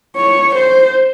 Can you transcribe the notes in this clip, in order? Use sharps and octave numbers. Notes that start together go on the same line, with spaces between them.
C#5
C5